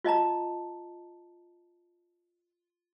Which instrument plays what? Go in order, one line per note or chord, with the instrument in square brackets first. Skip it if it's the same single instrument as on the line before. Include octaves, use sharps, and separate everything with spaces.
[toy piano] F4 D#5 A5 A#5